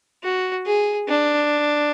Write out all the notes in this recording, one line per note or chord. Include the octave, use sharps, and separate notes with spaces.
F#4
G#4
D4